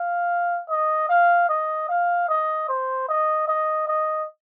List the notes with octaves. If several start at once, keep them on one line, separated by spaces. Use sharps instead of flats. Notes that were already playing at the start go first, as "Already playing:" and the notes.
Already playing: F5
D#5
F5
D#5
F5
D#5
C5
D#5
D#5
D#5